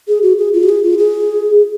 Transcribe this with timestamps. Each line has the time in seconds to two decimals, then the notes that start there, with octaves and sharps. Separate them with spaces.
0.08 G#4
0.23 F#4
0.38 G#4
0.54 F4
0.63 F#4
0.69 G#4
0.84 F4
0.98 G#4